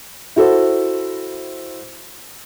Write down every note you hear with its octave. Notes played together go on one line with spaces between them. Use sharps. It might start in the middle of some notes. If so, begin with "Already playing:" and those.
E4 F#4 A4 C5